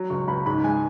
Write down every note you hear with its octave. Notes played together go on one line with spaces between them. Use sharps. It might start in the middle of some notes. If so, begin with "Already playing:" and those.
Already playing: F#3
C#2 C#6
C#2 B5
G#2 B5
G#3 G#5